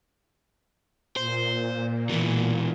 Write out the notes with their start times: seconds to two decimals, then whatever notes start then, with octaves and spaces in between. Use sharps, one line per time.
1.16 A#2 C5
2.09 B2 E3